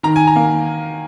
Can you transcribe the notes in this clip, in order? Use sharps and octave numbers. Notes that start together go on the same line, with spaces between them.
D#3 A#5
G#5
A#5
A#3